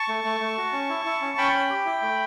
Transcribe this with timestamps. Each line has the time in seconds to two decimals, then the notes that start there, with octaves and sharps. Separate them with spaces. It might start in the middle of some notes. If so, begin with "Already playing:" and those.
Already playing: A5 C#6
0.08 A3
0.24 A3
0.40 A3
0.57 F#4
0.72 C#4
0.89 E4
1.05 E4
1.21 C#4
1.38 C#4 G5 B5
1.54 C#4
1.69 G4
1.86 E4
2.02 A3